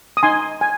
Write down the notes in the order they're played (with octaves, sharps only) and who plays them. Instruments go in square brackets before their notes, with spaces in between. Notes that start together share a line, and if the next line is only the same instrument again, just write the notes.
[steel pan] D#6
D#4 G#5 C6
G#5